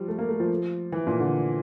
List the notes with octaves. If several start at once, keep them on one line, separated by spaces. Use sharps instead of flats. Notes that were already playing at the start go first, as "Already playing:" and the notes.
Already playing: F3 G3
A3
A#3
A3
F3
E3
A#2
D3